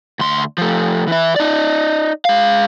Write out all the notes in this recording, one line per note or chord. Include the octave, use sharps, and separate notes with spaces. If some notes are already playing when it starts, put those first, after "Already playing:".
D2 C6
F3 A3
E3 E4
D#4 D5
G#3 F5